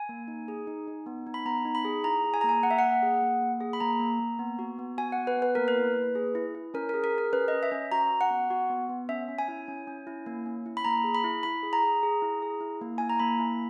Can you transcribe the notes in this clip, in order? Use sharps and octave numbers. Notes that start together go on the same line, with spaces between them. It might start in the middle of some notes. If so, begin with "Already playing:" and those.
Already playing: G#5
A#3
D#4
G#4
D#4
D#4
B3
D#4
B5
B3 A#5
D#4
B5
G#4
E4 A#5
G#4
G#5
A#5
A#3
G#5
A#3 F#5
E5
A#3 F#5
G#4
A#3
A#3
G#4
B5
A#3 A#5
A#3
A#3
B3
F#4
B3
F#4 G#5
F#5
B3
B4
B3
B4
A#3 A#4
B4
E4
A#3
G#4
E4
E4
C#4 A#4
G#4 A#4
A#4
G#4
A#4
C#4 B4
C#4 D#5
E5
C#4
F#4 A#5
F#4
F#5
B3
F#4
B3
B3
C#4 E5
C#4
G#5
E4
C#4
C#4
E4
A#3
C#4
E4
B5
A#3 A#5
G#4
B5
E4
E4 B5
G#4
A#5
G#4
G#4
E4
G#4
E4
A#3
E4 G#5
A#5
A#3 B5
E4